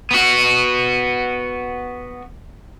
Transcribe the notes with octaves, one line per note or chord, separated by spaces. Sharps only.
B3 F#4